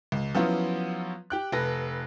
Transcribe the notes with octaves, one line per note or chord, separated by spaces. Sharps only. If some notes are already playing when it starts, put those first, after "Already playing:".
C#2
F3 F#3 B3 C#4 E4 F4
G4 G5 F#6
F1 A4 B4 A#6